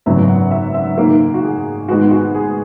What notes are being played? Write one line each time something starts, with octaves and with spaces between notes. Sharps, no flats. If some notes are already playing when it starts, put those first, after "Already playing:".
G#1 F#2 C#3 F#3 B3 E5
F#5
E5
E5
G#2 D#3 A#3 A#4
F#4
G#4
G#2 D#3 G#3 B3 F#4
F#4
G#4